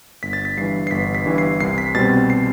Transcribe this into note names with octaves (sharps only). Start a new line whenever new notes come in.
G1 B6
A6
B6
G2 E3 C7
C7
G1 B6
B6
G2 E3
C7
C2 C7
B6
B2 G3 C4 A6
C7